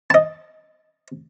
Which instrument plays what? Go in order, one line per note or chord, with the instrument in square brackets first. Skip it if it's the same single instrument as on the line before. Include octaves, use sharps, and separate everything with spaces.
[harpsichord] D#5 A5